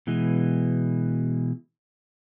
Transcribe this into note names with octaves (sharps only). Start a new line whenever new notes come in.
B2 E3 G#3